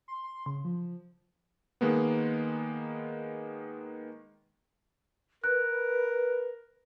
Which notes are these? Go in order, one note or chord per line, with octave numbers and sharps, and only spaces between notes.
C6
C6
C#3
F3
D#3 G#3 A#3 B3
A#4 B4 F#6